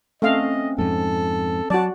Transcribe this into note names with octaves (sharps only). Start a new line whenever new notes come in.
A3 C4 C#4 D#5 F5
F2 G#2 A4
F#3 F#4 D5 A5